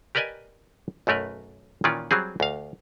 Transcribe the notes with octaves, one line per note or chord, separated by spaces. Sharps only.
G4 A#4 B4 D5 D#5 G#5
B1 F#2 A3 A#4 B4
A#2 D#3 E3 C#4 F4 D5
F#3 G3 C4 G#4
D2 F5